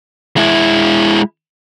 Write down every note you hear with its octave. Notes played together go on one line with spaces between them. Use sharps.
G#3 E4